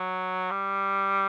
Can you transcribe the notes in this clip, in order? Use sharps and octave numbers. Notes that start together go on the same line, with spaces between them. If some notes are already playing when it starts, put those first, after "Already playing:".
Already playing: F#3
G3